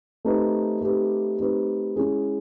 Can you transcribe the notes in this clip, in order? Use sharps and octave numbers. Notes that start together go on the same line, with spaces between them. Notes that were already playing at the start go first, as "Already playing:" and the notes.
A3 C4 D#4 G4 B4
A3 C4 D#4 G4 B4
A3 C4 D#4 G4 B4
G#3 C#4 E4 G#4